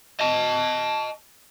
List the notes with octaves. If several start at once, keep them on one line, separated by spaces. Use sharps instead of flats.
D#5 A5